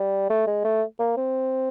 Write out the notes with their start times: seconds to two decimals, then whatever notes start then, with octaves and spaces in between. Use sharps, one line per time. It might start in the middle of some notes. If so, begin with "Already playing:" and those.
Already playing: G3
0.30 A3
0.47 G#3
0.65 A3
0.99 A#3
1.17 C4